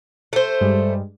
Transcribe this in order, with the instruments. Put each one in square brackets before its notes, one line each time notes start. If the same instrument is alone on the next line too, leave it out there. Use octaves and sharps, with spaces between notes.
[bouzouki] A3 C5
[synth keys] G2 G3 G#3